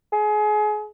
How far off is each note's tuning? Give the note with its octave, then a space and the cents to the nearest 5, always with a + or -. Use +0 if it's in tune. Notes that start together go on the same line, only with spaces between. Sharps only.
G#4 +30